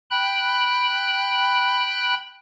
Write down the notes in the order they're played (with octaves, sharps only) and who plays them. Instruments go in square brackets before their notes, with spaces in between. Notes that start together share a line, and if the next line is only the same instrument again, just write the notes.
[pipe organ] G5 B5 F#6